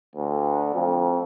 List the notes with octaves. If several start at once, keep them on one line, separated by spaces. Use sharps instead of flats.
D2
F2